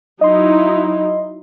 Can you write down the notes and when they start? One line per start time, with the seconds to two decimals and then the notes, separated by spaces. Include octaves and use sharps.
0.21 F#3 D#4 E4 D#5 C6